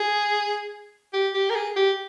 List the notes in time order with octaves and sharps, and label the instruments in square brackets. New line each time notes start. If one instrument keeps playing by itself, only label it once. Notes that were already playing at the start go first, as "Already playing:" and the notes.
Already playing: [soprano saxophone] G#4
G4
G4
A#4
G#4
G4